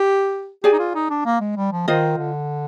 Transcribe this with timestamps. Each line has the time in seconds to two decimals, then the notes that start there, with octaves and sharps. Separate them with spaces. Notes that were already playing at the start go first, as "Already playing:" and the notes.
Already playing: G4
0.64 G4 G#4 D5 G#5
0.73 D#4
0.79 F4
0.95 D#4
1.10 D4
1.26 A#3
1.40 G#3
1.56 G3
1.72 F3
1.87 D#3 F4 C5 D#5
2.18 D3